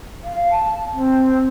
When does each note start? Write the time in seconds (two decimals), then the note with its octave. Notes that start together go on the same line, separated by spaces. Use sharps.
0.24 F5
0.50 A5
0.94 C4